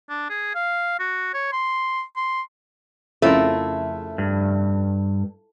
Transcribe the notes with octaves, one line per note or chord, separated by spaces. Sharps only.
D4
G#4
F5
F#4
C#5
C6
C6
F2 C#3 A3 E4 F4 A#4
G2